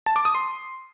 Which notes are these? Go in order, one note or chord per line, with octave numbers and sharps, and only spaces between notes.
A5
D6
D#6
C6